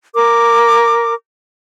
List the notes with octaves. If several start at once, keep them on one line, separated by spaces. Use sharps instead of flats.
A#4 D6